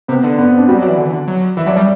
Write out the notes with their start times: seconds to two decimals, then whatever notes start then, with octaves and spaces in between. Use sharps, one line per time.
0.08 C3 B3
0.24 D3
0.38 B3
0.48 C4
0.58 D4
0.68 G3 F#4
0.78 F#3 D5
0.88 E3
0.98 D3
1.05 E3
1.12 D3
1.28 F#3
1.57 E3 E5
1.66 F#3 D5
1.76 G3 D5